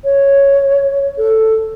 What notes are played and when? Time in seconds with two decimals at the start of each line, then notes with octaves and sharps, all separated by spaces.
0.04 C#5
1.18 A4